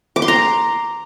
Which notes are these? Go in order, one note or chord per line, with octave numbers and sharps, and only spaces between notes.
D6
C6
A#5